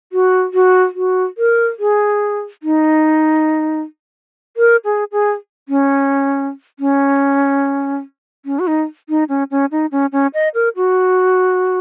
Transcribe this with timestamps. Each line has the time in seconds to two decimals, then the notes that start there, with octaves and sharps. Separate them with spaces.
0.12 F#4
0.54 F#4
0.95 F#4
1.38 A#4
1.79 G#4
2.63 D#4
4.57 A#4
4.85 G#4
5.12 G#4
5.69 C#4
6.79 C#4
8.45 C#4
8.59 F#4
8.67 D#4
9.09 D#4
9.29 C#4
9.51 C#4
9.71 D#4
9.92 C#4
10.12 C#4
10.34 D#5
10.54 A#4
10.76 F#4